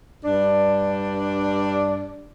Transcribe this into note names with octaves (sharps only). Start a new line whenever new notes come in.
G2 D4